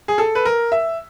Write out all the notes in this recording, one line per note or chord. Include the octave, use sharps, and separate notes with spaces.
G#4
A4
B4
A#4
E5